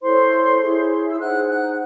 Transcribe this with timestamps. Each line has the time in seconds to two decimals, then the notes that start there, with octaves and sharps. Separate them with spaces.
0.02 E4 A4 C5 C#5 C6
0.61 E4 G#4 C#5
1.12 E6
1.20 D#4 G#4 C5 F#5 F#6
1.49 F#5 F#6